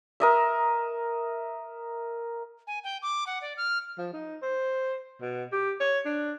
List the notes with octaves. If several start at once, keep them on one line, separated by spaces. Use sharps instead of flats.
A#4 D#5 E5
G#5
G5
D6
F#5
D5
F6
F3
D#4
C5
B2
G4
C#5
D4